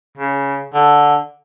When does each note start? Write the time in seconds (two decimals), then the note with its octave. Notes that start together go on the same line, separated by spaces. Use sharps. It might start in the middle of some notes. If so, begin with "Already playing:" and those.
0.17 C#3
0.74 D3